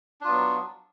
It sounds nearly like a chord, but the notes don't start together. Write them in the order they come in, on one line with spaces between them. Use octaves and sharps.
D4 F4 B3 F#3